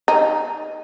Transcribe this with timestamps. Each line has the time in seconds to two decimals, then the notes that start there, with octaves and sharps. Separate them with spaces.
0.08 D#4